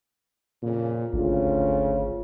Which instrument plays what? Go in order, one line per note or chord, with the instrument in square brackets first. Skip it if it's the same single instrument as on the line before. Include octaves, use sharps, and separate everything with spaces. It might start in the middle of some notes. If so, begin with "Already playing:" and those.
[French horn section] F2 C#3 [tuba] A#2
[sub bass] G#1 [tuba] D2 [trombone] C#3 [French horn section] F4